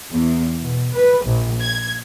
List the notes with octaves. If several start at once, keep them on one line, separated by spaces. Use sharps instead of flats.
E2
B2
B4
A#1
G#6